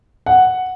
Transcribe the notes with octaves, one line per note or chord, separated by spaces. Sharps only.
F#5